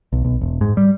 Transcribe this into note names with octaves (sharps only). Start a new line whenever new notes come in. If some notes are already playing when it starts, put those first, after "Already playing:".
B1
B1
E1
G#2
G3